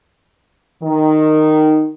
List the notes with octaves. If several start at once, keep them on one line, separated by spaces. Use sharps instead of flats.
D#3